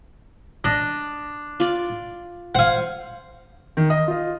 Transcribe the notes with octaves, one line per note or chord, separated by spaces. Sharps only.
D4 D#5
F4 D5
C5 F5 F#5 G#5
D#3
D#5 D#6
F4 D#5